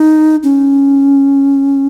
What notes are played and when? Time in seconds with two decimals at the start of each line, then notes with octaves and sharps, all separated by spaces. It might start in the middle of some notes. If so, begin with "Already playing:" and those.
Already playing: D#4
0.43 C#4